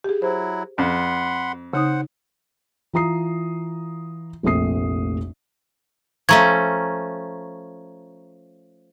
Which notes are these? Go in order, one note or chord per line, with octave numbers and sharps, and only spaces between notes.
G4 G#4
F#3 E4 C5
F2 F#5 B5 C6
C#3 D#4 C5 F#5 D#6
E3 F4 A#5 D#6 C7
F1 A#1 A3 C4 D#6 C7
F3 A3 C#4 A#5 C#6 G#6